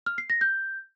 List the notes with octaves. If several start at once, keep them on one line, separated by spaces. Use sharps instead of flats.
F6
C7
A#6
G6